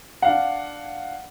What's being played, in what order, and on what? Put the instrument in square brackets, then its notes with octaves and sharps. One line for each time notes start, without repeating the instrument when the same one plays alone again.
[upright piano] D4 F5 F#5